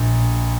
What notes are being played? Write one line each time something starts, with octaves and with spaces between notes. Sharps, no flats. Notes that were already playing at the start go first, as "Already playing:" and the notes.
Already playing: A#1